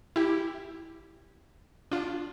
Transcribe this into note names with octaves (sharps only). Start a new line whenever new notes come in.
E4 G4
D4 F4